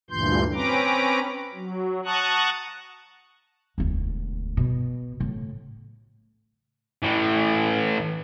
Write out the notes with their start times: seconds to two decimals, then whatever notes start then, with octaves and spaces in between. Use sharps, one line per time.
0.10 D2 G2 A#2 E3 C6 G6
0.54 C4 C#4 B4 A#5 D6
1.54 F#3
2.05 F#5 A5 A#5 C#6 D#6 F#6
3.78 E1 D2
4.57 B2
5.20 A2 C#3
7.03 A2 E3